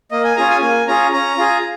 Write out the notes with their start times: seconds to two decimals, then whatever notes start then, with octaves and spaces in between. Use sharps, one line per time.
0.11 A#3 D#5
0.24 G#5
0.36 C#4 F4 G#4 A#5
0.50 G#5
0.61 A#3 G#5
0.87 C#4 F4 G#4 A#5
1.13 C#4 A#5
1.38 F4 G#4